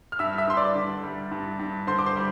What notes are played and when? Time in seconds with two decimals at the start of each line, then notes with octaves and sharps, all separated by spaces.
0.12 F6
0.19 G2 E5 E6
0.38 E5 E6
0.48 G2 C6
0.57 D5 D6
0.75 D3
1.03 G3
1.31 G2
1.59 G2
1.87 D3 C5 C6
1.99 D6
2.06 C5 C6
2.16 G3